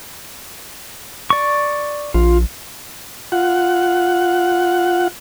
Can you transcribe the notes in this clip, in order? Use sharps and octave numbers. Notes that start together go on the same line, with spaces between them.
D5 C#6
A#1 F4
F4 F#5